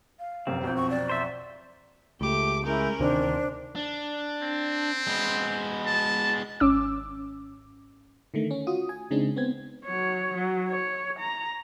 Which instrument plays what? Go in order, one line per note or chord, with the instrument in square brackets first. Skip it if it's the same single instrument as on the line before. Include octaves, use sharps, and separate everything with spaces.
[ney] F5
[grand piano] F1 F#2 [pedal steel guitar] C4
[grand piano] B1 F2 [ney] C5
[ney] C#6
D5
[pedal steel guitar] C5 E5
[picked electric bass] C#2 [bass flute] A3 [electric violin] G4 D6
[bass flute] G#3 [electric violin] C#4 A#4 [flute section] E4 D#6 G6
[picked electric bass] D2 C3 D#3 [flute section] D4 [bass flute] C5
[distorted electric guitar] D4
[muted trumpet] C4
[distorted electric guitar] G#3 B3
[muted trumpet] A5
[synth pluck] G#1 C#4 D6 E6
[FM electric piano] D3 D#3 A3
C#4
F4 F#4 D#6
G#5
C#3 G#3 C4 D4 D#4
B3 C4 G#6
[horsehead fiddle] F#3 C#5
F#3
C#5
A#5